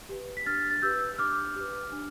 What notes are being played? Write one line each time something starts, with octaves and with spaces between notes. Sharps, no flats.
G4 B4
B6
D4 F6 A6
A6
G4 B4 E6 G6
D4 D6 F6
G4 B4
D4